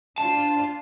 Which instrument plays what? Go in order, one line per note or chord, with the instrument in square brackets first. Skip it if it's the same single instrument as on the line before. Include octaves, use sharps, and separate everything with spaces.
[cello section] D4 F4 C5 [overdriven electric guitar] A5